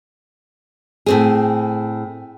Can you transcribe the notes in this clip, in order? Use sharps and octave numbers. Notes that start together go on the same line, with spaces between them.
A2 C4 G#4